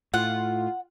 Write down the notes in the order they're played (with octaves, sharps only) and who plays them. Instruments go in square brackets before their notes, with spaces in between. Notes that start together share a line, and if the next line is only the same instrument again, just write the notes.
[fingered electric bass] A2 [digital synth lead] F4 [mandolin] F#5